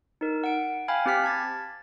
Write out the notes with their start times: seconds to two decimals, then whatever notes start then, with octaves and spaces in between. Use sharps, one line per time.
0.21 D#4 A#4
0.44 F#5 D7
0.88 F5 G5 G#5 B5 F6 G#6
1.06 C4 G4 F6 B6
1.24 A5 G#6 A6